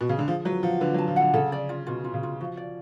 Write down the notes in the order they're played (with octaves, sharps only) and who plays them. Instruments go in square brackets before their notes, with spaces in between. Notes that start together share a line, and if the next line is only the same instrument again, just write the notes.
[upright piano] B2
C#3
D3
[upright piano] F3 [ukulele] G#4
[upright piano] F#3 [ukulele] B4
[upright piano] F3 [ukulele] F#5
[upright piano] D3 [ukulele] B4
[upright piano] F#3
[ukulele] A5
[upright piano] F3
[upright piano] D3 [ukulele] F#5
[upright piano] C#3 [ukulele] A4
[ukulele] D5
F4
[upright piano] B2 [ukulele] F4
[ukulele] F4
[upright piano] C#3
[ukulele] F4
[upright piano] F3 [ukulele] F#4
[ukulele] D5